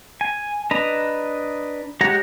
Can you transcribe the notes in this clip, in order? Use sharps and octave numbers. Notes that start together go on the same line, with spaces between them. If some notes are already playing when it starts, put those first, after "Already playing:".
G#5
D4 B4 D#5 A#5
G#3 G4 C#5 F#5 A#5